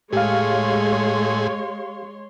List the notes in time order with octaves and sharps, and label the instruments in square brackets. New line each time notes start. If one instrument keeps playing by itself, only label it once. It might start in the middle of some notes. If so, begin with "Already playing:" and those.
[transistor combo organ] A2 G#4 [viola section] G#3 C#5 C6 [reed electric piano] G4 F5